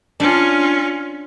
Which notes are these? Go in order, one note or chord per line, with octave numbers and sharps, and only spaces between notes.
C#4 D4 F4